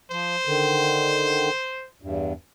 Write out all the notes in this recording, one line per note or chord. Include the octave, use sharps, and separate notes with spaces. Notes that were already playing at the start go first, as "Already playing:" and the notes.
F3 C5
D3 D#3
E2 G2